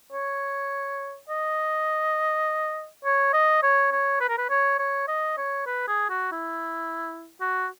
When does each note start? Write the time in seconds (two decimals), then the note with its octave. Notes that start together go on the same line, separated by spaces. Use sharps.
0.13 C#5
1.29 D#5
3.05 C#5
3.33 D#5
3.63 C#5
3.91 C#5
4.20 B4
4.29 A#4
4.38 B4
4.50 C#5
4.79 C#5
5.08 D#5
5.37 C#5
5.66 B4
5.88 G#4
6.10 F#4
6.32 E4
7.41 F#4